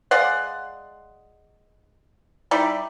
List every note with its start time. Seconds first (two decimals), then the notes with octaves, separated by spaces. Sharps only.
0.11 G#3 D5 F5 F#5
2.51 G3 D#4 E4 D5